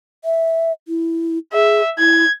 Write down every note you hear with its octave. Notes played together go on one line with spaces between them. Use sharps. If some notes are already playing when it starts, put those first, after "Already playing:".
E5
E4
G#4 E5
E4 G#6